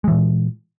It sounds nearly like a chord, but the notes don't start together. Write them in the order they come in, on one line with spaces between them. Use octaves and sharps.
G#3 E3 A#2